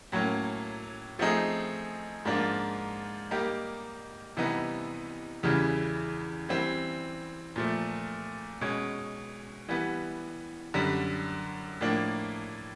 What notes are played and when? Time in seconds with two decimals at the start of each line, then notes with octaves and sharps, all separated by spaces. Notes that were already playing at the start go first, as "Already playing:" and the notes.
0.12 A2 F#3 A#3 C#4
1.19 F3 A3 C4 D#4 G#4
2.25 G#2 F3 A#3 D4 F4
3.31 G3 A#3 D#4 G4
4.37 C3 E3 G3 B3 D#4
5.43 E2 C#3 E3 G3
6.49 E3 G3 C4
7.56 A#2 F3 A3
8.61 B2 G#3 C#4
9.69 E3 G3 B3
10.74 F#2 D3 G3
11.81 A2 F3 A#3 D4